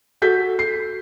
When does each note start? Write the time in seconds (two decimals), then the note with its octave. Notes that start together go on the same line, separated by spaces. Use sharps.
0.22 F#4 A4 G6 B6
0.59 C7